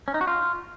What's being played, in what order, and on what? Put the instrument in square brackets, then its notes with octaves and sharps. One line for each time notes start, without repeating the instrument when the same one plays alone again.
[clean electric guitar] C#4
D#4
F#4
F4